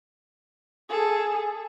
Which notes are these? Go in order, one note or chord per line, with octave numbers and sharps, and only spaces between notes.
G#4 A4